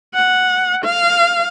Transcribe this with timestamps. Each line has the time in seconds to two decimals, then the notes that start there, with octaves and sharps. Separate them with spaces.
0.15 F#5
0.84 F5